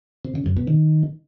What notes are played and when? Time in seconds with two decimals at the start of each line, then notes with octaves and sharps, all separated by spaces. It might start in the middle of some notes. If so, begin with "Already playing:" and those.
0.25 C3
0.35 C#3
0.46 F#2
0.57 B2
0.67 D#3